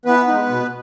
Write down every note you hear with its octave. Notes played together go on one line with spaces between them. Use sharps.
E3 B3 B4
G#3 D#4
B2